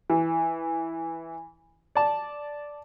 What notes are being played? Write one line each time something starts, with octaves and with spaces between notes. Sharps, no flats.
E3
D5 A5